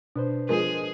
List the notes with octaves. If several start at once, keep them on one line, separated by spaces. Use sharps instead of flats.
B2 D4 B4 C5
F3 G#3 G#4 A#4